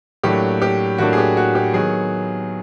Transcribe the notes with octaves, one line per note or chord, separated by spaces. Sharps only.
A2 F#3 A#3 D4 G4
G4
A2 F#3 A#3 D4 F#4
G#4
G4
F#4
G4
D#3 F#3 B3 G#4